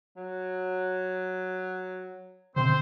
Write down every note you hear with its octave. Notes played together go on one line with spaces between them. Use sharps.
F#3
B2 D3 D#3 C4 C5